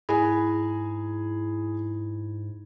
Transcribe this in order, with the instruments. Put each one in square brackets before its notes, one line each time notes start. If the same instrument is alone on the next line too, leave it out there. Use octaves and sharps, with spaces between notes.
[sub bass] G#2 [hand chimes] E4 B5 [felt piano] G#4 G#5